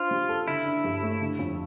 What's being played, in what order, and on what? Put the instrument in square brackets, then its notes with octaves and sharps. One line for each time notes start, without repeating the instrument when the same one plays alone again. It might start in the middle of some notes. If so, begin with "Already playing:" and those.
Already playing: [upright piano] D4 C5 [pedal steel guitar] F4
[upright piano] G3
A4
[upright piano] D3 [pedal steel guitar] E4
[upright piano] D4
G2
A3
D3
F2